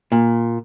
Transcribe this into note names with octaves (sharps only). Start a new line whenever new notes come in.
A#2